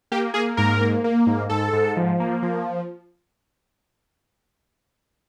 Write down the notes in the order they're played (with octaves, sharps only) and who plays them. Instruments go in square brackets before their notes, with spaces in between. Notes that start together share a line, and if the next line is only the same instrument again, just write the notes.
[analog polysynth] A#3 G4
A#3 G#4
G#2 A#4
A#3
A#3
G#2
G#2 A4
G#2
F3
A#3
F3